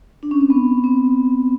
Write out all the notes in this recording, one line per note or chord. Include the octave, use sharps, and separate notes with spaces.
D4
C#4
C4
B3
C4